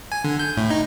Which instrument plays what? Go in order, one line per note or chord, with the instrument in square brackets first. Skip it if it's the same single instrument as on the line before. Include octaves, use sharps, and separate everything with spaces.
[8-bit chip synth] G#5
D3
G6
A2
D#4